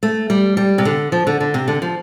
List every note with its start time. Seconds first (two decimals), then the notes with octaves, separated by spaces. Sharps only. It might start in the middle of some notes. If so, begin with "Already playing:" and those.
0.03 A3
0.30 G3
0.57 G3
0.78 C3
0.85 D3
1.12 F3
1.27 D3
1.40 D3
1.54 C3
1.68 D3
1.82 F3